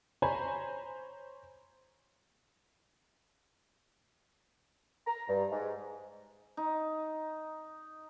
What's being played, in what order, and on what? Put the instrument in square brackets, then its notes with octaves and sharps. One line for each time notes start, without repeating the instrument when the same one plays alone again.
[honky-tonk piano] C5 C#5 G#5 A#5 B5
[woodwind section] A#5
G2
G#2
[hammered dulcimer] D#4